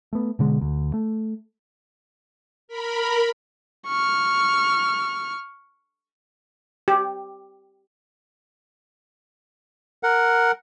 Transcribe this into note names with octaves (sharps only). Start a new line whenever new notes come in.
A3 B3
B2 D3 G#3
D2
A3
A#4 B5
C#6 F6
G4
A#4 F#5